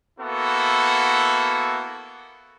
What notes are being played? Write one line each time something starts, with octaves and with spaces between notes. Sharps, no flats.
A#3 B3 E4 F#4 A4